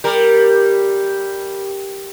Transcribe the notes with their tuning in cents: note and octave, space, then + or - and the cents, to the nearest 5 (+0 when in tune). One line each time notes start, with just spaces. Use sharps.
G3 +0 A#4 +0